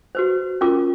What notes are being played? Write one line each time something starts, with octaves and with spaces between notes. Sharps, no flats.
F#4 B4 C5
C#4 F4 A#4 D6